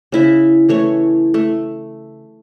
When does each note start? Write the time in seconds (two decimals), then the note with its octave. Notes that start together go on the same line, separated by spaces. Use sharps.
0.12 C#3 E4 E5
0.69 E3 A3 C#5
1.34 A3